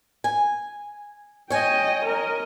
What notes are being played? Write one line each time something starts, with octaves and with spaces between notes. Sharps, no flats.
G#5
C#5 D#5 G5 G#5
A#4 D#5